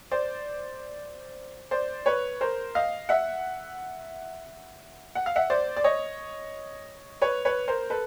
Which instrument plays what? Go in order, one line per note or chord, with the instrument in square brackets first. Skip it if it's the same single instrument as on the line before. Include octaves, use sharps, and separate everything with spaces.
[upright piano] C5 D5
C5 D5
B4 C#5
A#4 C5
D#5 F5
E5 F#5
F#5
F5
E5 F#5
C5 D5
D5
C#5 D#5
B4 C#5
B4 C#5
A#4 C5
A4 B4